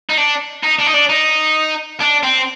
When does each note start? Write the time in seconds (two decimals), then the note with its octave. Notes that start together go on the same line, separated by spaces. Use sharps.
0.10 D#4
0.17 D4
0.64 D#4
0.79 D4
0.87 D#4
0.94 D4
1.09 D#4
2.01 D4
2.23 C4